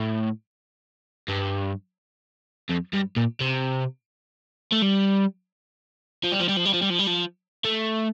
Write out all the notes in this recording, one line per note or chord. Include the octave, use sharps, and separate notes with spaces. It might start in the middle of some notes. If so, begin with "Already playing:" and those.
Already playing: A2
G2
F2
G2
A#2
C3
A3
G3
F3
G3
F3
G3
F3
G3
F3
G3
F3
G3
F3
A3